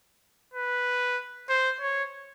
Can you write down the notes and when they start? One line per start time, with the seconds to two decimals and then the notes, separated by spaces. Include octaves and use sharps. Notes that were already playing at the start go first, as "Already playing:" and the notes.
0.54 B4
1.49 C5
1.81 C#5